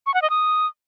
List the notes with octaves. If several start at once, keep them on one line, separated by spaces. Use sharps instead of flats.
C#6
F#5
D#5
D#6